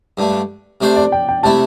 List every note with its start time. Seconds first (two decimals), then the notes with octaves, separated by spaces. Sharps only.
0.17 G2 D3 A3
0.81 C3 A3 D4 C5
0.96 D5
1.12 G5
1.28 G5
1.43 C3 A3 E4 A5